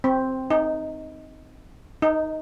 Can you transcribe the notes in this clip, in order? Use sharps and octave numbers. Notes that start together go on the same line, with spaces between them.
C4
D#4
D#4